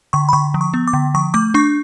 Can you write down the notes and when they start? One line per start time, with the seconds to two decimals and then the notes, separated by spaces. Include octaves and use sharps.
0.13 D3 C#6
0.29 B5
0.33 D3 C#6
0.54 F3
0.61 C#6
0.74 B3
0.88 D6
0.93 D3
1.15 F3 C#6
1.34 A3 D6
1.54 D4 C#6